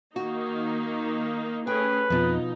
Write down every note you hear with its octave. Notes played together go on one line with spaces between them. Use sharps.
D#3 A#3 D#4 F#4
A3 C#4 G#4 B4 G5
F2 B2 F3 D#4